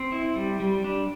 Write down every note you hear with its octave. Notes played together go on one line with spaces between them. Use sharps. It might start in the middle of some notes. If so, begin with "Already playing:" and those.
Already playing: C4
E4
G3
G3
D4